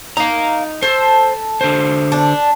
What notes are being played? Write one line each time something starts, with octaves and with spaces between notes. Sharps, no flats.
D#4 F5 A#5
A4 C5
D3 C5
D4